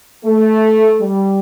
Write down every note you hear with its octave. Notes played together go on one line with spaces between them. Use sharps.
A3
G3